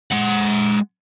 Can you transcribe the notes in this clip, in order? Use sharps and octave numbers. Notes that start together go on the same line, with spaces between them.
G#3 F#5